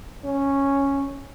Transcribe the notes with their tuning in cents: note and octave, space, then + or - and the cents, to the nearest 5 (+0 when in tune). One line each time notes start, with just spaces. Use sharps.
C#4 -5